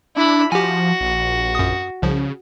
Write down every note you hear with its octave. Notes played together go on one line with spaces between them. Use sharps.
D4 E4 B5
F3 F#4 G4 G#5
A#1
F#2 D#6
C2 C#3 F3